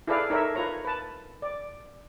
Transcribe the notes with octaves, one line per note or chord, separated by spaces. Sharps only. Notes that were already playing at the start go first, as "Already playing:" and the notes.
E4 G#4 A4 B4 D5 F5
D#4 A4 A#4 C#5 E5
F4 B4 C#5 A#5
B4 A5
D5